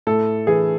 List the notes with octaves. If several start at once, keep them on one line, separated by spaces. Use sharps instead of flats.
A2 A4
E3 G#4